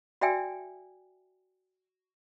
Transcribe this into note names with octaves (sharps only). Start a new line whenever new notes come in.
F#4 D5 E5 G5 G#5 E6